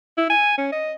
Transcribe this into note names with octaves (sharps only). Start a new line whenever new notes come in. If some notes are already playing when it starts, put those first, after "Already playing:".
E4
G#5
C#4
D#5